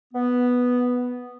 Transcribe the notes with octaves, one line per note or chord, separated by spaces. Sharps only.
B3